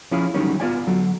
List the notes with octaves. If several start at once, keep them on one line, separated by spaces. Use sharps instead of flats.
F3 C#4 E4 G#4 F5
D3 D#3 F#3 G3 C#4 D#4
B3 F4 D5 G#5
D3 F#3